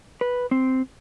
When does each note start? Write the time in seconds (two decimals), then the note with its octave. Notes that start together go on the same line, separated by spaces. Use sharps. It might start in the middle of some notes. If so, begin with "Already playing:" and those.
0.21 B4
0.51 C4